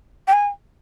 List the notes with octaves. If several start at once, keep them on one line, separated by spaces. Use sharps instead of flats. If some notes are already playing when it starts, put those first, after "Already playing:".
G5
G#5